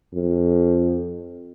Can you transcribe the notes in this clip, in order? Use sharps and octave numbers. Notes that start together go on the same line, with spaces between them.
F2